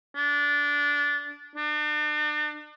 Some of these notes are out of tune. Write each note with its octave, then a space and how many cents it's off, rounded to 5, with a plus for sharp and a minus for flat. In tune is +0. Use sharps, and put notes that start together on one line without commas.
D4 -20
D4 +40